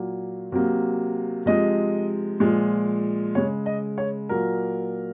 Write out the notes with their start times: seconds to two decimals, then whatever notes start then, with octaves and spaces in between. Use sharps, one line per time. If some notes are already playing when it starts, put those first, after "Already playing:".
Already playing: A#2 F#3 A#3
0.52 C3 F#3 A#3
1.46 C3 F3 G#3 D#5
2.40 A#2 F3 G#3
3.35 C#3 G#3 C#5
3.66 D#5
3.98 C#5
4.29 A#2 F#3 A#3 A#4